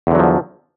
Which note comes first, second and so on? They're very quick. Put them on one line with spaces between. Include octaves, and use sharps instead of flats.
E2 D3 F#3 F3